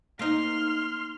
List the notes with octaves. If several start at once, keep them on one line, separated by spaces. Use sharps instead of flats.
A#3 D#4 C6 F6